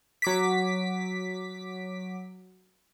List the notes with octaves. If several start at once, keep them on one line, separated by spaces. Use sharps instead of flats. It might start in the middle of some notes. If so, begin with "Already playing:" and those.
F#3 D6 B6